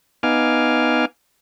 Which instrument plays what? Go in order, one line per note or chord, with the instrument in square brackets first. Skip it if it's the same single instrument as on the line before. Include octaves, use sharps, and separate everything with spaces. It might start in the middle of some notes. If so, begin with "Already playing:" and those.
[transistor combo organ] B3 D#4 F5 G#5 D6 F6